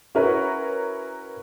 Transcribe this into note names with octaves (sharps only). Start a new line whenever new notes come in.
C#4 E4 F#4 A#4 B4 C#5